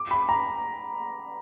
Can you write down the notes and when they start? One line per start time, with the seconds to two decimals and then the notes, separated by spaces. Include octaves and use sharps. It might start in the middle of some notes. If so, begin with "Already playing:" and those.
Already playing: D6
0.11 B5
0.29 A#5